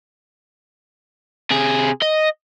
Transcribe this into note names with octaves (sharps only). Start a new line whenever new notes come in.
C3 G#4
D#5